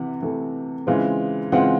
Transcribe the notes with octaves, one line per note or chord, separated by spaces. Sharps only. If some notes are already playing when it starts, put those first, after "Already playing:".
Already playing: C3 E3 F#5
C3 E3 A3
C#3 E3 G#3 C4 F4
C#3 E3 G#3 C4 F4 F#5